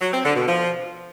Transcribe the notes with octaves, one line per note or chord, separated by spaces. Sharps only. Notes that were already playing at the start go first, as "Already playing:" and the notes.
F#3
C4
D3
B2
F3